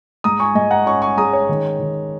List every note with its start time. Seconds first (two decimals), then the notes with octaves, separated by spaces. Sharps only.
0.24 G#2 A#5 D#6
0.40 G#5 C#6
0.55 G#2 D#5 G#5
0.71 F#5 A#5
0.86 C#4 G#5 C#6
1.02 G#5 C#6
1.17 G#3 A#5 D#6
1.33 C#5
1.49 D#3
1.80 D#3